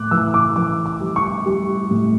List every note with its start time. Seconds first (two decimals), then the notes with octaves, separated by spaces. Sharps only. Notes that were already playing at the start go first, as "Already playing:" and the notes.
Already playing: A2 D6 F#6
0.11 E3 E6
0.34 D6
0.56 E3 D6
0.86 D6
1.01 G3
1.16 C#6
1.46 G3
1.91 A2